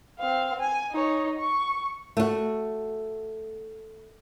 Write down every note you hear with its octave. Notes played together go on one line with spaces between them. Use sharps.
C4 F5
G#5
D#4 C#5
C#6
A3 F#4